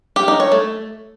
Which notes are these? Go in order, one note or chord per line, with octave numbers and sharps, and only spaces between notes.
G4
D#4
C#5
A3